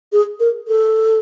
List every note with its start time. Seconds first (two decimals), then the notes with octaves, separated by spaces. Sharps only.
0.12 G#4
0.40 A#4
0.68 A4